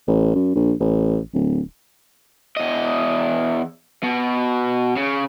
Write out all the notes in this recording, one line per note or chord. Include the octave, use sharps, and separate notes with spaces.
A1
F#2
A#1
A1
D1
E2 D#5
B2
C#3